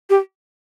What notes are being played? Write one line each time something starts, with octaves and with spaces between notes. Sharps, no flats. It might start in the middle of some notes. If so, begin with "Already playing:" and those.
G4